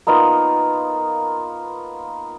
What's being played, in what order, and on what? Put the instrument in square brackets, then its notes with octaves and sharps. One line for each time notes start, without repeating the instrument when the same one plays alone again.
[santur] A#3 B3 D#4 F4